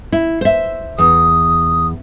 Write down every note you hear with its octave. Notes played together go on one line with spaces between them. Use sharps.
E4
C5 E5
E2 D#6